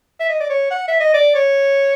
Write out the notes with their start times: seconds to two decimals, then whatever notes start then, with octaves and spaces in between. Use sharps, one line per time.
0.20 E5
0.29 D#5
0.40 D5
0.50 C#5
0.71 F#5
0.88 E5
1.00 D#5
1.14 D5
1.35 C#5